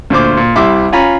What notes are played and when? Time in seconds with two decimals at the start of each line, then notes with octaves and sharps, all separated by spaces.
0.10 D2 A#2 C5 D6
0.37 A#2
0.56 C2 G3 E4 E5 C6 D6
0.92 C#4 F4 G#5 A#5 B5